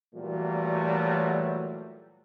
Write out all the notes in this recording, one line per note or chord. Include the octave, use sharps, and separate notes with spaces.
A#2 E3 F#3 G3 A3